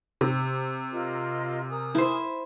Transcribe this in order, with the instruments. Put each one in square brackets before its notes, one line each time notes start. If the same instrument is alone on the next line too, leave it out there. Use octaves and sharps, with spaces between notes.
[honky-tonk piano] C3
[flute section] F4 A#4 D#5
A#4 G#5 D#6
[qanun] E4 C5